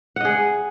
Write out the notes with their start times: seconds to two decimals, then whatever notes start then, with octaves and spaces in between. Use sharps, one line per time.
0.16 F#5
0.21 D#5
0.25 G#4